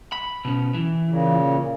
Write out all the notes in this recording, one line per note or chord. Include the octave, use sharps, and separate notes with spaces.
B5
B2 C#4
E3
A#2 C#3